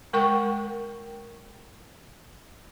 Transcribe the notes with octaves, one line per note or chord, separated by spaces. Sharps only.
G#3 A#4 G5 C#6